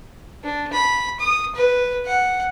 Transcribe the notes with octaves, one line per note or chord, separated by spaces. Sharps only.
D4
B5
D#6
B4
F#5